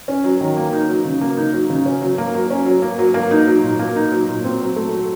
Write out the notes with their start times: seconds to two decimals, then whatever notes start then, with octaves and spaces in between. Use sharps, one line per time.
0.08 C#4
0.24 F#3
0.41 D#3
0.57 A#3
0.73 D#4
0.89 F#3
1.05 C#3
1.21 A#3
1.37 D#4
1.53 F#3
1.70 C#3
1.86 C#4
2.02 F#3
2.18 A#3
2.35 F#3
2.50 C#4
2.66 F#3
2.82 A#3
2.99 F#3
3.14 A#3
3.31 D#4
3.47 F#3
3.63 A#2
3.79 A#3
3.96 D#4
4.12 F#3
4.28 A#2
4.44 C4
4.60 F#3
4.76 A3
4.92 F#3